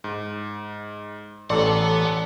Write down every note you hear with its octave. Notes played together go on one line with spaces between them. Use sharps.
G#2
A1 B3 C#4 A4 D5 F#5 A#5 C6